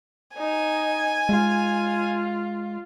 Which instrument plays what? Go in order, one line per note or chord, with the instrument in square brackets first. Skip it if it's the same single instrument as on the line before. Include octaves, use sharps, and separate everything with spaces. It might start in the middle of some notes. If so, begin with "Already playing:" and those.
[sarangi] D#4 [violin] G#5
[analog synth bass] G#3 [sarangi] F4